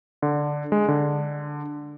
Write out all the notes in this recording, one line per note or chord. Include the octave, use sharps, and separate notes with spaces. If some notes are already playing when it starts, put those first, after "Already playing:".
D3
G#3
D3